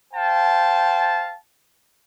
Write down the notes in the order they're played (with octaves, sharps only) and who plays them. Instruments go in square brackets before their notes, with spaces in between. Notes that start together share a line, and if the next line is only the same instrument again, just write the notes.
[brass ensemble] C5 F5 G5 A5